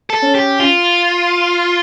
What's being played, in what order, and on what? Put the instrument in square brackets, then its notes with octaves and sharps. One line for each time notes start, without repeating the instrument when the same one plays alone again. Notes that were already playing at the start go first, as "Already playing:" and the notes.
[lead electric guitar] A4
[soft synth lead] C#4
[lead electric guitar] G4
F4